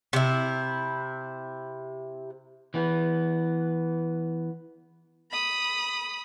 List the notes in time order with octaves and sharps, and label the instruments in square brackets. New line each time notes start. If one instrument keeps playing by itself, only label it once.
[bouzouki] C3 E4
[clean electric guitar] E3 B3
[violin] B5 D#6